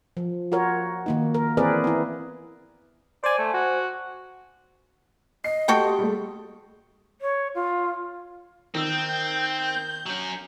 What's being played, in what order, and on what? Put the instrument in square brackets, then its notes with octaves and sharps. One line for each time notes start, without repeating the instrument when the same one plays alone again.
[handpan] F3
F4 F#4 A#4 C#5
D#3 A#3 D#4
A#4
E3 C4 G#4 A#4 B4 D5
B3 E4
[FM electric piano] C5 G#5 [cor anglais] D5
[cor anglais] A3
F#4
[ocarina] D#5 [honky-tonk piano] C7
[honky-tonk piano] A3 [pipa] F#4 A4 G5 [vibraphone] G4 C6 D#6
[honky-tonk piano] G3 A3 [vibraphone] G#4
[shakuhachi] C#5
F4
[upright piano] D#3 E6 [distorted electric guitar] C4 [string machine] G6
[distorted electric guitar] F#3 C#4